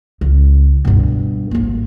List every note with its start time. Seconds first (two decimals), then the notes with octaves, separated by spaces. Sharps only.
0.21 C#2
0.85 G2 B2
1.51 G#1 A#3